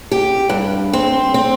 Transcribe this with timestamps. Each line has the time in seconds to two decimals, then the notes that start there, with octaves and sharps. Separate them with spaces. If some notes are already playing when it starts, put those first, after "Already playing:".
0.11 G4
0.50 G2
0.93 C4
1.34 C4